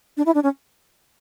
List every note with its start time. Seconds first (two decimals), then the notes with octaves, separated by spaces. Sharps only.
0.17 D4
0.26 E4
0.35 D4
0.43 C#4